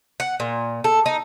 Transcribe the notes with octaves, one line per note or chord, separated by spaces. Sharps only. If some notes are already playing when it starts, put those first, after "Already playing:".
F#5
A#2
A4
D#4